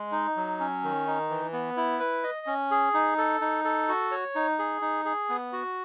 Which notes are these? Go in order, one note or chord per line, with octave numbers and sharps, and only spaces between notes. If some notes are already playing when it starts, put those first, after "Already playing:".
Already playing: G#3
D#4
F#3
C#4
D#3
D#4
E3
B3
E4
B4
D#5
C#4
G#4
D#4
A4
D#4
A4
F#4
C#5
D#4
G#4
D#4
G#4
B3
F#4